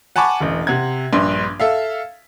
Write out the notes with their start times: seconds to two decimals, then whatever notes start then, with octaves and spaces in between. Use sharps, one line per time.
0.16 F#5 G#5 A5 B5 C#6 D6
0.41 E1 A1
0.67 C3 F#5 G#6
1.13 A#1 G2 C6
1.60 A4 E5 F5